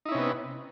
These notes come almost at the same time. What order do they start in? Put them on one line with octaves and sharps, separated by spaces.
D#4 E4 C#4 C3 B3